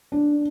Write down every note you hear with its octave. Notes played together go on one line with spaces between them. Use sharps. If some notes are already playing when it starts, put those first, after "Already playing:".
D4